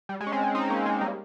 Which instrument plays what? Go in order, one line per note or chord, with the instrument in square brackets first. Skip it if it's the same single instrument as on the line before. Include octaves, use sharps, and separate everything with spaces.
[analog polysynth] G3
G#3
C#4
G#3 C4
G#3
C4 D#4
A#3 C#4
G#3 C4
G3 A#3